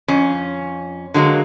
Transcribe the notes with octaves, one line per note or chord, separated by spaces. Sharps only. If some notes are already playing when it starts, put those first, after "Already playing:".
F2 C#4
D3 F#3 G#3 A#3